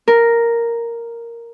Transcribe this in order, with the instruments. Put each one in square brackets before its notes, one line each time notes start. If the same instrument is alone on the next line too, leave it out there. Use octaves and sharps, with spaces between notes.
[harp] A#4